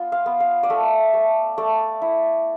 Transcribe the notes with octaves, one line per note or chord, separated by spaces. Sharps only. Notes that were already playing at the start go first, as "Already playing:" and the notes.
Already playing: B3 F4
F5
B3
F5
D5
A3 E5
A3
A3 D5
E4